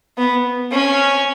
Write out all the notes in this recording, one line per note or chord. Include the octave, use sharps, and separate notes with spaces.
B3
C#4